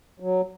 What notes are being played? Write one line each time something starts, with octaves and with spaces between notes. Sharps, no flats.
F#3